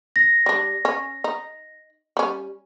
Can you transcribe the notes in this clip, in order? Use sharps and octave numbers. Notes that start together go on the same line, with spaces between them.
A#6
G3 D4
C#4
D#4
G3 C#4